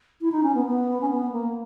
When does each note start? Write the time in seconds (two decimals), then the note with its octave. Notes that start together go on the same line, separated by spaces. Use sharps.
0.21 E4
0.32 D#4
0.43 C#4
0.55 B3
0.66 B3
1.01 C#4
1.10 B3
1.32 A#3